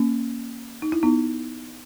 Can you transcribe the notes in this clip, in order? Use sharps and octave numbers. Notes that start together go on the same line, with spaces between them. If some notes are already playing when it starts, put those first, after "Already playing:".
Already playing: A#3 C#4
D#4
E4
B3 D#4